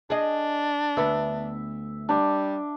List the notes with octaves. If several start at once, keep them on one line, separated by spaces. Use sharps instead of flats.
D4 G#4 D#5
D2 B3 E5
G3 D4